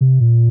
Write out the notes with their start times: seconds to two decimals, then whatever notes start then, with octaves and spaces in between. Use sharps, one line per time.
0.01 C3
0.21 A#2